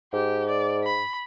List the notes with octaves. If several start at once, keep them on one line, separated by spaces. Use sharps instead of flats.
G#2 G4
D5
B5